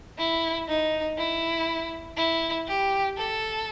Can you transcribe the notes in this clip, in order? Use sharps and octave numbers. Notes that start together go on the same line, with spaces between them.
E4
D#4
E4
E4
G4
A4